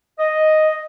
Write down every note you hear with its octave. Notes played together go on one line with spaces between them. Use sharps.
D#5